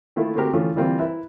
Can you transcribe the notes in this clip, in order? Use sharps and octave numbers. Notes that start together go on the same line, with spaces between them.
D#3 A3 A#3 E4 F4
A3 A#3 C4 F#4 G4 A#4
E3 F3 A3 C#4 F4
E3 G3 A#3 C4 F4
E4 A#4 B4 E5